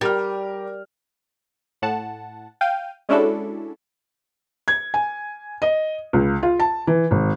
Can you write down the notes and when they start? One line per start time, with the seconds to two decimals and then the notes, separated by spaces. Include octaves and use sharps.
0.01 G3 G4 A#4 F6
1.82 A2 F#5 A5
2.61 F5 G5 D#7
3.09 G#3 C#4 D4 E4 F#4 A4
4.68 G#6
4.94 G#5
5.62 D#5
6.13 C#2
6.43 F4
6.60 A5
6.87 E3
7.11 G#1